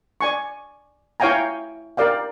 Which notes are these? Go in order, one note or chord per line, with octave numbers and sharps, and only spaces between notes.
D5 G#5 C#6
E4 C#5 F5 G5 G#5 A#5
A#4 D5 F5 G5